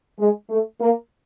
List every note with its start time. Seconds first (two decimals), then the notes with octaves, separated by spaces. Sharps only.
0.19 G#3
0.50 A3
0.80 A#3